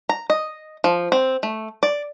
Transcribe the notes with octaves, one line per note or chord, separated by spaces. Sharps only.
A#5
D#5
F3
C4
A3
D5